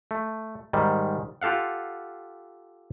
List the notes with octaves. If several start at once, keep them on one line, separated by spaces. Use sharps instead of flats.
A3
G#2 D#3 G3
F4 G4 A4 F5 F#5